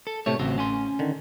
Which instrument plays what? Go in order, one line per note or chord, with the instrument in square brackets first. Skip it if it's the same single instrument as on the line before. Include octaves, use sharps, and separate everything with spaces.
[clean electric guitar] A4
[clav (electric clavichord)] A2 C3 A3 [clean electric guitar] C#5
[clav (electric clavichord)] A1 [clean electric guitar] C#3 C4 F#4
[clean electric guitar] C#4 G#5 C6
[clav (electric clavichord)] D3 D#3